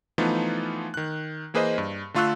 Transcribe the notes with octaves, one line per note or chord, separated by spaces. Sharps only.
E3 F3 A3 B3 D#4 F4
D#3 F#6
E3 A#3 G#4 B4 C5 D#5
G2
D3 A3 F4 C#6 E6 F#6